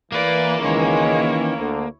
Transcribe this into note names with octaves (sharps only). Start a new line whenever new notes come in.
E3 A#3 B4 D5
C#2 D#3 E3 G#3 C#4 E4 C#5
D2 D3